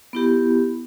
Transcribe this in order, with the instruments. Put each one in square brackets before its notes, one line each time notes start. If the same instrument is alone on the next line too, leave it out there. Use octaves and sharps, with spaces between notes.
[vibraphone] B3 E4 G4